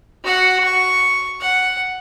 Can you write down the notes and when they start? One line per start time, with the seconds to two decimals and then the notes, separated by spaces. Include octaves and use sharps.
0.24 F#4 F#5
0.65 C#6
1.41 F#5